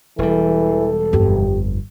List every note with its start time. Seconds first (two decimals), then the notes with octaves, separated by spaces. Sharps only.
0.19 E1 E3 G3 A4
1.13 G1 F2 G4